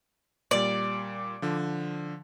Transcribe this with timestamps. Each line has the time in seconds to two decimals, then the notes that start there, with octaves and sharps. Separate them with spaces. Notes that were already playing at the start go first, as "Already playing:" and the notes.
0.51 A#2 G3 D5
1.42 D3 F3